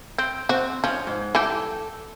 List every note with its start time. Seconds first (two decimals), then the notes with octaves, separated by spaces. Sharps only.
0.18 C4
0.49 C4 F#4
0.84 F3 C#4 F5
1.07 G#2
1.35 E3 G3 G4 A4